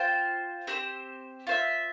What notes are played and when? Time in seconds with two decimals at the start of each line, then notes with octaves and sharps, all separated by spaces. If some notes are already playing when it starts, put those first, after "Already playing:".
Already playing: F4 C5 G5
0.67 C4 G4 C5
1.47 F4 C5 E5